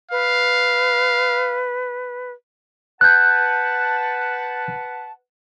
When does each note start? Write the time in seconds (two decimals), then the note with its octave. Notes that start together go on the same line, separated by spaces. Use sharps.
0.11 B4 F5
3.01 B4 F#5 A5 F#6 G6